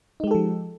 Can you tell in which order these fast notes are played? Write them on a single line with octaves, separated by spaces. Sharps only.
D#4 G#3 G4 A4 F3